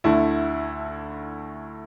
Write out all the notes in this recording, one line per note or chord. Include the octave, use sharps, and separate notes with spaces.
D2 D3 A3 E4